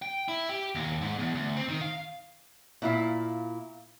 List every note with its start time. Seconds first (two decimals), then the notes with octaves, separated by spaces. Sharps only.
0.02 G5
0.28 E4
0.49 G4
0.75 D#2
1.01 G#2
1.19 E2
1.35 D2
1.57 C4
1.68 D#3
1.81 F5
2.82 A#2 E4 F5